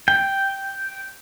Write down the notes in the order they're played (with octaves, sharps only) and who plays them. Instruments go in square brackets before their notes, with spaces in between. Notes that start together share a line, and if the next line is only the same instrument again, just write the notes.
[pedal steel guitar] G5